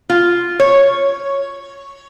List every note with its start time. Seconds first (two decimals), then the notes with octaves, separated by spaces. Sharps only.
0.10 F4
0.60 C#5